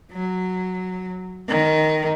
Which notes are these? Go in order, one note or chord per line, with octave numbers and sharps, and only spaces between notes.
F#3
D#3